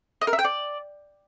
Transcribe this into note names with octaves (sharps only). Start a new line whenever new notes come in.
D#5
A#4
E5
G5
D5